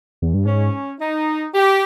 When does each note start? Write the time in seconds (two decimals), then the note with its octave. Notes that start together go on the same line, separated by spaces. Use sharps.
0.22 E2
0.34 G2
0.45 G#2 C#4
0.99 D#4
1.53 G4